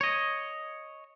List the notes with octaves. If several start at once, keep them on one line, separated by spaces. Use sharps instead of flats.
C#5 D#5